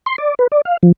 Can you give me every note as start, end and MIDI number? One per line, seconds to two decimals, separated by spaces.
0.06 0.16 84
0.18 0.34 74
0.39 0.47 71
0.52 0.61 74
0.65 0.77 77
0.83 0.92 53